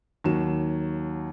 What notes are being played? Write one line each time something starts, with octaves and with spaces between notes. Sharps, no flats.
D#2 F#3 E7